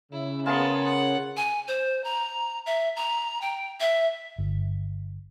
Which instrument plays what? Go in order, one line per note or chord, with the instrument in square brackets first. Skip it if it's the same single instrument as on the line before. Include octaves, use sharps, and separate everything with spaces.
[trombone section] C#3 [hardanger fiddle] E4
[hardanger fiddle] B3 A5 [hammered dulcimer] F4 G#4 A#4
[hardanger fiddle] F#5
[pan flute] G#5
C5
A#5
E5
A#5
G5
E5
[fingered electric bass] G1